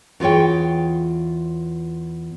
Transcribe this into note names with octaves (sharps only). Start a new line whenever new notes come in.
E2 F4 G#4 C#5 G5